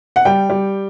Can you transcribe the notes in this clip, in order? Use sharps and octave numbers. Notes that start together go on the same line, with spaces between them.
F#5
G3 G5
G3